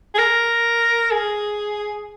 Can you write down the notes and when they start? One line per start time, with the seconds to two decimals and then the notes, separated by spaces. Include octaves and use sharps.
0.14 G#4
0.19 A#4
1.11 G#4